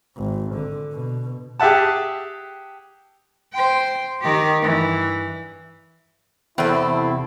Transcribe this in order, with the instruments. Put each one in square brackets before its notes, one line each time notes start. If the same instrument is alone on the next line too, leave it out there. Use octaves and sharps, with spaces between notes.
[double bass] G#1
D3
B2
[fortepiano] G4 G#4 E5 F#5 A5
[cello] C5 G5
D#3 G4
G2 E3
[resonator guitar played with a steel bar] E2 [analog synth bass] C3 [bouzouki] C4 A4 [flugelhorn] E4